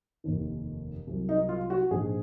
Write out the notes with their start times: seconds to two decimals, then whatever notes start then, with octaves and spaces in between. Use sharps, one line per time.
0.24 F1 D#2 D#3
1.07 C2 C3 F#3
1.29 D#4
1.49 F4
1.70 F#4
1.91 A#1 G#2 F3 G#3 G#4